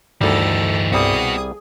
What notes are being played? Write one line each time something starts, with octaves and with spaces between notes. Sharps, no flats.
D2 G2 D#3 E3 G3 D#4 A4
C2 G3 B3 F#4 G#4 D#6